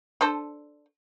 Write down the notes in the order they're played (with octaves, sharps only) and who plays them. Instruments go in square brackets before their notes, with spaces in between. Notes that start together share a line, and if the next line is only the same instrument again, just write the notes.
[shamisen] D4 A4 C5